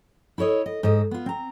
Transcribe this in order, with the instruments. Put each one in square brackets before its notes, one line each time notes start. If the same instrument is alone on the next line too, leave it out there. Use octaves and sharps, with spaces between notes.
[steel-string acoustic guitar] E4 A4 C#5 D#5
D#5
G#2 A4 D#5
B3 F4
C4 A#5